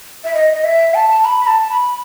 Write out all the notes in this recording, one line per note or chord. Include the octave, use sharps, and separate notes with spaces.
E5
D#5
D#5
E5
A5
B5
B5
A5
B5